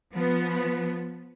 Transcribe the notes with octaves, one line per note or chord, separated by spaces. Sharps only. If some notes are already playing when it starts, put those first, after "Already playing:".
F3 B3